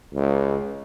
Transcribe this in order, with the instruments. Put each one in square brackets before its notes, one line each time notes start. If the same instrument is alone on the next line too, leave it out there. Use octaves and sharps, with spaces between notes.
[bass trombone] C#2